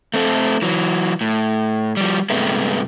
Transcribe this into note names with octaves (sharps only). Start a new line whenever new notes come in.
A3 C4 A4
E3 F#3
A2
F3 G3
G2 C3 G#3 A3 B3